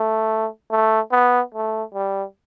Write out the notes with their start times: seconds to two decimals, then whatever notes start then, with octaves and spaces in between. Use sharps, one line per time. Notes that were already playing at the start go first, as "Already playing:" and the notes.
Already playing: A3
0.71 A3
1.12 B3
1.54 A3
1.94 G3